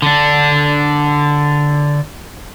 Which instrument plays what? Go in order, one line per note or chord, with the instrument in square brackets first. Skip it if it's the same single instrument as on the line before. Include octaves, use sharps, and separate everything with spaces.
[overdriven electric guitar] D3 D4